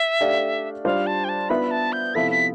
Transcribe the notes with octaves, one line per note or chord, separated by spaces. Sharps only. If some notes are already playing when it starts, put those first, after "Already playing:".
Already playing: E5
A3 D4 G4 D5 F5
G3 D4 F4 C5 F5
A5
G5
A5
B3 D4 F4 B4 E5 B5
A5
G6
C3 F3 B3 E4 A4 B6
B6